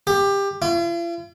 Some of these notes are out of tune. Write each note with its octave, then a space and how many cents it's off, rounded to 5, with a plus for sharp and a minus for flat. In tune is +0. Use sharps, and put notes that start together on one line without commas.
G4 +20
F4 -45